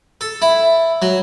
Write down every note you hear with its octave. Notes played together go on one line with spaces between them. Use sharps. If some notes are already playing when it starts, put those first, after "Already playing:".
A4
E4
F#3